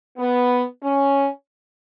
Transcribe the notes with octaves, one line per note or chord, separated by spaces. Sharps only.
B3
C#4